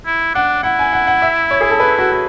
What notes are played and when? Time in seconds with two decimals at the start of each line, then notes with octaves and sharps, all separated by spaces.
0.06 E4
0.35 D4 F#5
0.63 E4 F#5
0.79 G#5
0.93 F#5
1.07 F#5
1.22 E5
1.51 C#5
1.61 G#4
1.70 A4
1.80 B4
1.99 F#4
2.12 F#4